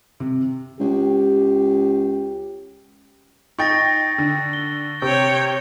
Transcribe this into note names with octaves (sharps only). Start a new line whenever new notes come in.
C3
C#2 G4
D#4 G5 C#6 A6 A#6
D3
G7
C3 C#5 G5 C#6